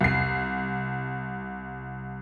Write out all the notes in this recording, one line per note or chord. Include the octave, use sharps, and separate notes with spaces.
C2 C7